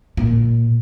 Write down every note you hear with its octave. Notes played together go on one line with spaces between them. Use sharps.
A#2